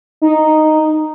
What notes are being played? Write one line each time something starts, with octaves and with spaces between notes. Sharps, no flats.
D#4